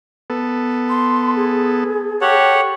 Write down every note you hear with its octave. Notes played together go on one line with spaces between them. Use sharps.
B3 A4
C6
G#4
G4 A4 C#5 F#5